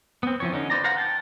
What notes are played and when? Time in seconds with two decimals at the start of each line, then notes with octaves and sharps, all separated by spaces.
0.23 B3 C4
0.40 E3 F3 C#5
0.52 D3 C#4 D#4
0.70 B4 C5 D5 A#5
0.84 B4 C5 F5 F#5 A#5
0.97 G5 A5